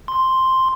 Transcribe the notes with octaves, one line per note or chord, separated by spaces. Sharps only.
C6